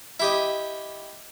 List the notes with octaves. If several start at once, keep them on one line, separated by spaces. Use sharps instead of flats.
E4 G4 D#5